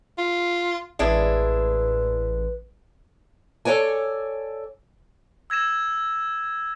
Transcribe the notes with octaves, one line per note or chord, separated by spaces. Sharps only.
F4
A1 G#3 D4 E4 B4
A4 A#4 C#5 D5 G#5
E6 G#6 A#6 E7